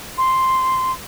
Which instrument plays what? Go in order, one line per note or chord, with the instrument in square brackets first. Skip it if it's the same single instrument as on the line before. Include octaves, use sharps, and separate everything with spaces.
[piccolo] C6